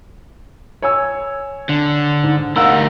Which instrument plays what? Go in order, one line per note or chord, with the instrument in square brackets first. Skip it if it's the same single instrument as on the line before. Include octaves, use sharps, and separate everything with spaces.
[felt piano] C#5 G#5 E6
[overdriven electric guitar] D3
[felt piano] G#2
[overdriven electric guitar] D2 A#4 [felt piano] F5 F#5 E6